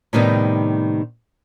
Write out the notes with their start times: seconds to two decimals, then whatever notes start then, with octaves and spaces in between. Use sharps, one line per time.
0.13 A2 C3 D#3 G3 B3 D#4